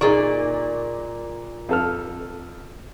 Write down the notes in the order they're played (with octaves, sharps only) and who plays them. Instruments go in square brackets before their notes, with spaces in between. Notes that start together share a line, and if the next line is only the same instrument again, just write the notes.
[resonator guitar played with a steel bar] A#2 A#3 D5 [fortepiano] D#4 G#4 C#6
[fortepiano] F2 A4 F6